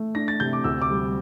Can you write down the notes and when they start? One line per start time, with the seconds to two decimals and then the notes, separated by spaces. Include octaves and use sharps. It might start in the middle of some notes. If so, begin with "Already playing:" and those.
Already playing: A3
0.15 D4 A#6
0.28 A6
0.40 C3 G6
0.53 D6
0.64 D2 E6
0.82 D6
0.90 G3